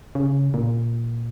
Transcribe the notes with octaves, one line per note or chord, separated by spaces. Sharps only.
C#3
A#2